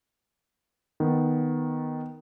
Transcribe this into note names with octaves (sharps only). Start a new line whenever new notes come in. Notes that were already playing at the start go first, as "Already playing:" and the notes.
D#3 B3